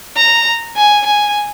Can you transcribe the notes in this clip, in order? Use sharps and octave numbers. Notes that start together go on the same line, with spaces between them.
A#5
G#5
G#5